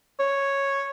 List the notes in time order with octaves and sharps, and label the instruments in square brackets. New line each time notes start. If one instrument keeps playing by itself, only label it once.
[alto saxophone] C#5